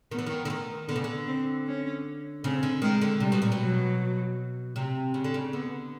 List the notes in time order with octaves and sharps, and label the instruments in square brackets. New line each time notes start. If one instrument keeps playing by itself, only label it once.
[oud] D#3 [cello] B3
[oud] E3
D#3
D3
D#3
[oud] D3 [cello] B3
[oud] C#3
D3
[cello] C4
C#4
[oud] C#3 [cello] C4
[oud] D3
[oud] D#3 [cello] G#3
[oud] D3
[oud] C3 [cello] G3
[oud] B2
A#2
B2
[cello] F#3
[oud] C3
C#3
D3
C#3
[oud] D3 [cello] B3